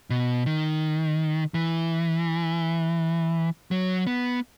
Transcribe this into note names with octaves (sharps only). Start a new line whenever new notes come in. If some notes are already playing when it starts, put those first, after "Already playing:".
B2
D#3
E3
F#3
B3